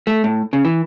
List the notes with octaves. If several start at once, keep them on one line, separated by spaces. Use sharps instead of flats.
A3
A2
C#3
E3